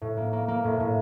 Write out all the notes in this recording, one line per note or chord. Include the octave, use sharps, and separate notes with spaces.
A2
A#3
A#3
A#3
A2
A2